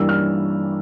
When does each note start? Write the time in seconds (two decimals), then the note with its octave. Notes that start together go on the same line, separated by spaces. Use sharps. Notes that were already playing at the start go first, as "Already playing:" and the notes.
Already playing: G2 E3 G3 A#3 D4 E6
0.09 F6